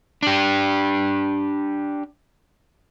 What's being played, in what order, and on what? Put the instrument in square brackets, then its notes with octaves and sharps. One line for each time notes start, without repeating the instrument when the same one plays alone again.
[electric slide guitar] D4 G4